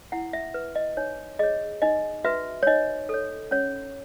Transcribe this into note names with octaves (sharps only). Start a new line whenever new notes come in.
E4 F#5
E5
B4
D#5
D#4 C#5
G#4 C#5 D#5
D#4 D#5
F#4 B4 E5
C#5
D#4 D#5
A4 C#5
C#4 C#5